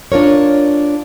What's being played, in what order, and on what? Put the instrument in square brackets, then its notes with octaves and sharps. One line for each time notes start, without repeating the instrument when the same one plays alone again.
[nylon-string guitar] D4 F4 A#4 C#5